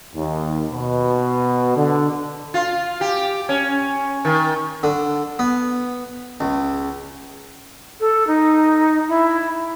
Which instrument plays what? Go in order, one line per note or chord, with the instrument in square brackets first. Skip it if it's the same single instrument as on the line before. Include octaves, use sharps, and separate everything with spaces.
[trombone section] D#2
B2
D3
[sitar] F4
G4
C#4
D#3
[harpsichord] D3
B3
C#2
[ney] A4
D#4
E4